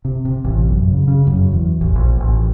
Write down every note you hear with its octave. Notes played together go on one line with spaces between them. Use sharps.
C3
C3
A1
F#2
C#3
C#3
F#2
E2
A1
A#1
A1